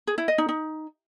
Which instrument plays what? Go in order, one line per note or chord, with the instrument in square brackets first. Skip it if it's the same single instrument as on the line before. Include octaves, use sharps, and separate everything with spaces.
[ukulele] G#4
E4
D#5
D#4
D#4